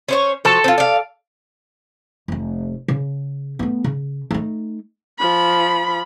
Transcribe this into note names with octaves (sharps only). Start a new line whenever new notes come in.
C#4 C5 C#5
F3 F#4 A4 A5
C4 F4
D5 F5
F1 A3
C#3
A3 B3
C#3
A3 D#4
F3 B5